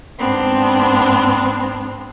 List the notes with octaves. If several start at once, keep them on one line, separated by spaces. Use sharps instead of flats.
G#2 B3 C4 D4